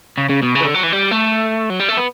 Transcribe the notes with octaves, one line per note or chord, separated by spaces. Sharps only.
C#3
C#3
B2
C#3
E3
D3
F#3
E3
G3
A3
F#3
G3
A3
B3